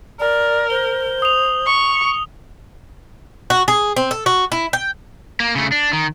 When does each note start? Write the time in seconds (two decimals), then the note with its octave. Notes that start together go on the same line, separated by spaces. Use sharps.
0.20 A#4 D5
0.70 C5 G7
1.22 D#6 F7
1.66 C#6
3.50 F#4
3.68 G#4
3.96 C4
4.11 A4
4.26 F#4
4.52 E4
4.73 G5
5.40 A#3
5.55 C#3 A3
5.72 D4
5.93 D#3